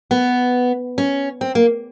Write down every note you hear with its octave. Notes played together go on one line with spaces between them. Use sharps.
B3
C#4
C4
A#3